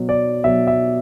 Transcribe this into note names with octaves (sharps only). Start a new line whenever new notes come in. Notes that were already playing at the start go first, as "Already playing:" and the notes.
Already playing: B2 F#3
D5
B2 F#3 E5
E5